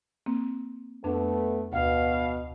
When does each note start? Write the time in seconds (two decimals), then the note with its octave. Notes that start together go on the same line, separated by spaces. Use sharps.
0.26 A#3 C4
1.04 F2 A3 B3 D4
1.73 D2 B2 F5